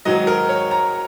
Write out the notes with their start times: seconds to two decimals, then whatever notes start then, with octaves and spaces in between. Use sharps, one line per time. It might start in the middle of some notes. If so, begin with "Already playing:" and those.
0.05 G#2 D#3 F#3 D#5
0.27 A#4
0.49 C#5
0.71 A#5